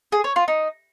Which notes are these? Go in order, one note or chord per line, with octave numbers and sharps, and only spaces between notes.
G#4
C#5
F4
D#4